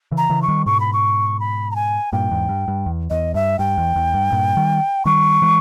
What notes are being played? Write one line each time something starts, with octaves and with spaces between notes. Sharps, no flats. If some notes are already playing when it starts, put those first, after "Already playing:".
C#3 E3
A#5
C#3 E3
C#6
D#3 G3
G#2 B2 C#6
B5
C#6
B5
A#5
G#5
G2 A#2 G5
E2 G#2
G2
G2
E2
E2 D#5
G2 E5
G2 G5
E2
E2
G2
G2 A#2
D#3 G3
D#3 G3 C#6
E3 G#3